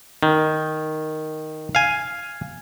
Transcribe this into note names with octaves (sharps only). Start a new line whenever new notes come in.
D#3
F5 G#5